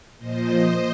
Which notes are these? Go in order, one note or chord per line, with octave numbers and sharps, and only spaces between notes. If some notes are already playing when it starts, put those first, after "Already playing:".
A#2 F3 C5 D#5